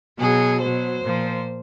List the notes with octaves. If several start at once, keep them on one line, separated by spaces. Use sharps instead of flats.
B2 F#3 G#4
B2 F#3 C5
A#2 F3